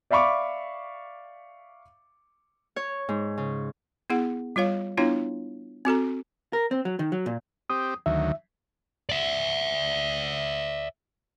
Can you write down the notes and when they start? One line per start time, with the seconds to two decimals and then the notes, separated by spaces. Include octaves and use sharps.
0.11 D5 E5 F5 B5 C#6 D6
2.76 C#5
3.09 G#2
3.38 C#3
4.10 B3 E4 G#4 F#5
4.56 G3 F4 C#5 F5
4.98 B3 D4 E4 F4 C#5 F5
5.85 C4 F#4 A4 A#5
6.53 A#4
6.71 C4
6.85 F#3
6.99 D#3
7.12 F#3
7.26 A#2
7.70 C4 G4 D#6
8.06 D2 D#3 F#3 E5
9.09 D5 E5